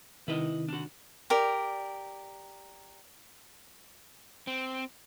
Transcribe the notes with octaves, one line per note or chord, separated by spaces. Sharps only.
C3 D#3 E4 B4 D#5
D4 F#4
G4 A#4 D5
C4